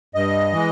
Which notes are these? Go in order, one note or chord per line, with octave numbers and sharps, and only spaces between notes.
G2 D#5
E3 G#3